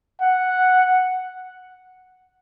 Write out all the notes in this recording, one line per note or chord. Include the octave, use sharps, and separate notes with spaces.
F#5